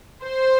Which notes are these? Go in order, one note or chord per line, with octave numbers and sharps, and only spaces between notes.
C5